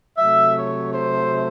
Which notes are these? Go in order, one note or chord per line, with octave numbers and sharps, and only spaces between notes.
C3 F#3 A3 E5
C#5
C5